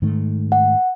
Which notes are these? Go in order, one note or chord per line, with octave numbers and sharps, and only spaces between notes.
G#2 D#3 A3
F#5